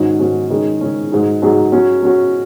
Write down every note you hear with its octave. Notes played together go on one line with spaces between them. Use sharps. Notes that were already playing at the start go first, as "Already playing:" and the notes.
Already playing: G#2 D#3 F#3 C#4 F#4
G#2 D#3 F#3 C#4 F#4
D#3 G#3 C#4 G#4
D#3 G#3 C#4 G#4
G#2 F#3 D#4 G#4
G#2 F#3 D#4 G#4
F#3 C#4 F#4
F#3 C#4 F#4